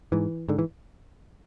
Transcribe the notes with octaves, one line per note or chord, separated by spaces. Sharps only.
G#2 E3
G#2 D3
E3